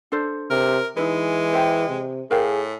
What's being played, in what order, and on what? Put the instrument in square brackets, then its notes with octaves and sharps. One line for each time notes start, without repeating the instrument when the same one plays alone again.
[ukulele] D4 A4 C5
[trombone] C3 [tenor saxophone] A#4
[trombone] E3 [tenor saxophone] G#3 [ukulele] D#4 E4 B4
[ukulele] C5 E5 G5
[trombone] C3
[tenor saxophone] A2 [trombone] G#4 [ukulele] A#4 F5 G5